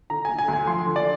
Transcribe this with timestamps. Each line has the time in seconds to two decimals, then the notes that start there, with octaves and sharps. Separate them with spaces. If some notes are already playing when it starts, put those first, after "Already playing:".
0.10 D3 A#5
0.25 D2 G#5
0.39 G#5
0.48 D2
0.53 G#5
0.67 F3 C6
0.86 D3
0.96 D5